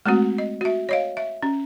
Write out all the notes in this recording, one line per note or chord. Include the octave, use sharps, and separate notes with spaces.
G#3 A3 C4 F#4
D#5
F#4 E5
C#5 D#5 F5
E5
C#4